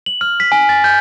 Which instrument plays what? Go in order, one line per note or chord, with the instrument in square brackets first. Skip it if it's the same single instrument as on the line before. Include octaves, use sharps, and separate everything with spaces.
[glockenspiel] F#7
F6
B6
G#5
A6
G6